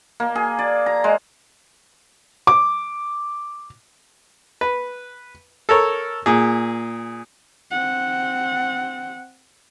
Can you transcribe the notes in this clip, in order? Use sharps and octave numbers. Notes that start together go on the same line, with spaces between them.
A#3
G#4
D5
A#5
G#3
D6
B4
A4 A#4 C#5
A#2 G#4
C4 F#5